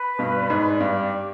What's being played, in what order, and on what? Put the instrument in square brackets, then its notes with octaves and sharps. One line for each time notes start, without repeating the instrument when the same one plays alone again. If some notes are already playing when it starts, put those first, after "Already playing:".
Already playing: [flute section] B4
[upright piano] G2 B2
[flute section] D5
[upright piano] G#2
[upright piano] G2 [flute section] G4